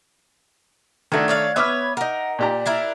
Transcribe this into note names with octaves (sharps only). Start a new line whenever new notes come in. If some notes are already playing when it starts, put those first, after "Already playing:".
D#3 A3 D4 F#4 A4 G#6
C#5 D5 F5
B3 B4 C#5 E5 D6 F6
D#4 A#4 F#5
A#2 G4 D5 A#5
D4 E4 A#4